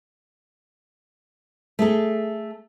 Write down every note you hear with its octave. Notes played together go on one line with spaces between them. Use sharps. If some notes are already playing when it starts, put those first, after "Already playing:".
A3 G#4 A4